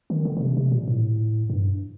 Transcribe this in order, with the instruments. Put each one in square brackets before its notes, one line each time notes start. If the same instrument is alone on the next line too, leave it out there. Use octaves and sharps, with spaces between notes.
[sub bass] D#3
D3
D3
C3
C3
A#2
A2
G2